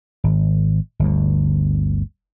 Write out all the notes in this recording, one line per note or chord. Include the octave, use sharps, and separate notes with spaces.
G#1
G1 D2